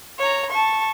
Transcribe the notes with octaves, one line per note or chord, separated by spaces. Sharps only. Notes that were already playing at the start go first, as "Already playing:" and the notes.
C#5 A#5
A5 C#6